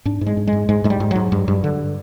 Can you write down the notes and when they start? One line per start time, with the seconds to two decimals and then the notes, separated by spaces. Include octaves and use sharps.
0.05 G#2 D4
0.21 G#2
0.26 G#3
0.37 G#2
0.47 G#3
0.53 G#2
0.69 G#2 G#3
0.84 G#2 G#3
0.90 G3
1.00 G#2
1.11 G#2 F#3
1.32 G2
1.48 G2
1.64 D3